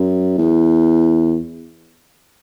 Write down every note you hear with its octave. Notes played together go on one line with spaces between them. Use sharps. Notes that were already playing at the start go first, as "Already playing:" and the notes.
Already playing: F#2
E2